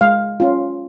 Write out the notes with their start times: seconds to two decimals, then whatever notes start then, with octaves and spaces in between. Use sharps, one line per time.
0.01 G#3 F5
0.40 C#4 F4